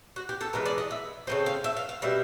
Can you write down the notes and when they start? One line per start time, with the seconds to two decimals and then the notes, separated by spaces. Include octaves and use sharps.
0.16 F#4
0.29 G4
0.41 A4
0.53 E3 G#3 B3 A#4
0.66 D5
0.78 D#5
0.91 E5
1.27 C#3 E3 A3 C4 D#5
1.46 F5
1.64 E5
1.77 F5
1.89 F5
2.02 B2 G3 C4 E5